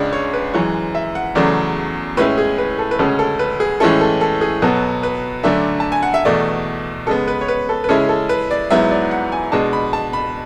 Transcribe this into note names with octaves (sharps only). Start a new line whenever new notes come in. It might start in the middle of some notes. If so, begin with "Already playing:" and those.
Already playing: C#2 C#3 G#3 D4 D5
C#5
B4
F#2 E3 G#3 C#5
E5
F#5
E2 C#3 F#3 A3 D5
A2 G#3 C#4 E4 B4
G#4
B4
A4
B4
D2 C#3 G#3 C#4 A4
A4
B4
G#4
A2 E3 G#3 C#4 E4 A4
A4
A4
G#4
B2 F#3 B3 A4
B4
F#2 D3 A3 D4 E5
A5
G#5
F#5
E5
E2 B2 A3 D5
C#3 G#3 B3 A4
B4
C#5
B4
A4
B4
C#3 G#3 C#4 E4 A4
A4
B4
D5
G#2 F#3 B3 E4 E5
D5
F#5
G#5
B2 G#3 D4 A5
B5
A5
B5